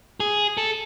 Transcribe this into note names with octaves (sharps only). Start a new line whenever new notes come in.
G#4
A4